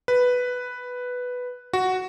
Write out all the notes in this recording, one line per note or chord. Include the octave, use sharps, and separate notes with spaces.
B4
F#4